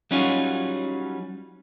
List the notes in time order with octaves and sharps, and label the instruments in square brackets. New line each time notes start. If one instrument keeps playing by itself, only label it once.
[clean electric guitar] F#3 G3 C#4 D#4 F4 F#4